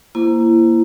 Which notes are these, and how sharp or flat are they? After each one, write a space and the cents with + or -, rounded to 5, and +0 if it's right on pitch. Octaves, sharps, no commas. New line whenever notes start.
A#3 +0 E4 +25 C5 +0